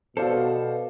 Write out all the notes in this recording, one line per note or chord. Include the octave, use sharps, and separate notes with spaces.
B2 A4 C5 D5 F5